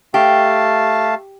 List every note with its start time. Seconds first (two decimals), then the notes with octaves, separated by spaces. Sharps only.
0.14 A3 G4 F5 A5